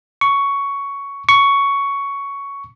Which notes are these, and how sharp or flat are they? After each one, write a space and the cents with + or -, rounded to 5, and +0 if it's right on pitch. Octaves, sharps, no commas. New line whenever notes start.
C#6 +10
C#6 +10